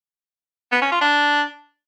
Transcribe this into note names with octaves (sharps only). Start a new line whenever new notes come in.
B3
C#4
F4
D4